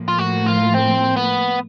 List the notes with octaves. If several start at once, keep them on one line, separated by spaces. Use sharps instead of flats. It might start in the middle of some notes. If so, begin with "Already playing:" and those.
Already playing: A2 F3 A#3
F4
F#4
F4
C4
B3